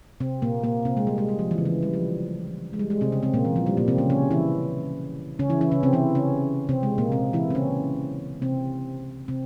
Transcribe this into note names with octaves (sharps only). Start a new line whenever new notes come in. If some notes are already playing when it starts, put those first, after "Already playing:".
C3 C4
A#2 A#3
A#2 A#3
C3 C4
G#3
G3
G#3
G3
F3
E3
C#3
E3
G3
F3
G#3
G3
G#3
C3 C4
C#3 C#4
C3 C4
A#2 A#3
E3
F3
G3
A#2 A#3
C3 C4
C#3 C#4
C#3 C#4
E3 E4
C#3 C#4
E3 E4
E3 E4
C#3 C#4
C3 C4
E3 E4
C#3 C#4
C3 C4
G#3
A#2 A#3
C3 C4
E3 E4
C4
C#3 C#4
C3 C4
C3 C4